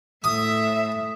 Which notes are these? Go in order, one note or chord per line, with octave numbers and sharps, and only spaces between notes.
A2 E5 D#6